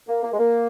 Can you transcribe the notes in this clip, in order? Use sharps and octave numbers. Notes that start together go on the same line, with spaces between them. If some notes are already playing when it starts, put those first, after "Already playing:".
A#3
A#3
G#3
A#3